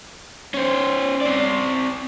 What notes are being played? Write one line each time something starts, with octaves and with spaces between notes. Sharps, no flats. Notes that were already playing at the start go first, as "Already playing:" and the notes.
C#4 C5
C4 D5